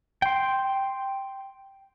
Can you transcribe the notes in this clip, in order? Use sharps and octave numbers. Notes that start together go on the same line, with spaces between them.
G5 C6